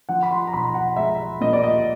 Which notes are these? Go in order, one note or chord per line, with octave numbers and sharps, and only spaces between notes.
F3 F#5
B5
C6
A#5
B1 B5
F#5
G#3 E5
A#2 D#5
D5
D#5